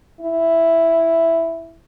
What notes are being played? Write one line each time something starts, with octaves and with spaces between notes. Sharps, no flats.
E4